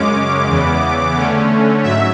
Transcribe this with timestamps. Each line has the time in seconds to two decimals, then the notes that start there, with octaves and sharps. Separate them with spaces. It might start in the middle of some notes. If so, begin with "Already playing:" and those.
Already playing: F#2 C#3 G#3 C#4 D6
0.47 E2 C#3 E3 B3
1.16 D3 A3 C#4
1.83 G#2 F#3 E5